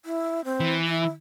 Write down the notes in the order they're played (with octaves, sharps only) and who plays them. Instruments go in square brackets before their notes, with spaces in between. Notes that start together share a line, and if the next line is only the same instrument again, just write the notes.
[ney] E4
C4
[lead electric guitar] E3
[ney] E4